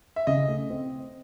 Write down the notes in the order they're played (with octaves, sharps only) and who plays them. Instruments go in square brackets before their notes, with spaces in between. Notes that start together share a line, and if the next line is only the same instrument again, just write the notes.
[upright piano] E5
[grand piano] C#3 [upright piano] D#5
[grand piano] A3
C4